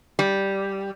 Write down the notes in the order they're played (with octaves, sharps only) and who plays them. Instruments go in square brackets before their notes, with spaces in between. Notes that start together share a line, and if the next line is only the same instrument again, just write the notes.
[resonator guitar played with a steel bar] G3